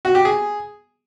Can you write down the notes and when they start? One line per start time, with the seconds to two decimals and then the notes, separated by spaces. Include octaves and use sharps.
0.05 F#4
0.15 G4
0.25 G#4